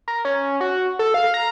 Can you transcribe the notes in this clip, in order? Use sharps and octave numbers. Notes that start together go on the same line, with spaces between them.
A#4
C#4
F#4
A4
F5
A#5